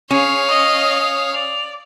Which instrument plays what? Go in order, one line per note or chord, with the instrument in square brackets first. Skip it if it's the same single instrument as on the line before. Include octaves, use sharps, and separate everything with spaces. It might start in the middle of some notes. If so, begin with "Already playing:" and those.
[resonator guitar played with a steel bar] C#4 [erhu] G#4 [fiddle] C#5 F5
[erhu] D#5 [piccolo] D#6
[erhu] D5 [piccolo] F7